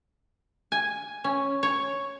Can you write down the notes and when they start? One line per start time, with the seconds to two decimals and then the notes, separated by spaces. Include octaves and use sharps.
0.72 G#5
1.24 C#4
1.63 C#5